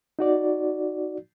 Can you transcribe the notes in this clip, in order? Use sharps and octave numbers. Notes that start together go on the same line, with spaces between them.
D#4 F#4 D5